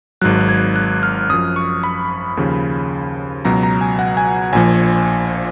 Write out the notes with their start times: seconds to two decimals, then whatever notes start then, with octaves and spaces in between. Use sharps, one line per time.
0.22 G#1 G#2 F#3 F#6
0.41 F#6
0.49 G#6
0.76 F#6
1.03 F6
1.29 F#2 F3 D#6
1.56 C#6
1.83 B5
2.37 D#2 C#3 F3
3.45 C#2 B2 F#3 A#5
3.63 A#5
3.81 G#5
3.99 F#5
4.17 G#5
4.53 A#1 A#2 F3 G#5